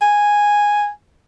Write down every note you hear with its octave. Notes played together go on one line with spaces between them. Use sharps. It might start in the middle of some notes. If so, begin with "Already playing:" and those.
G#5